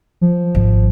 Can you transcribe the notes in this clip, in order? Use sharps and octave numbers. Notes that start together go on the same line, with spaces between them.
F3
G#1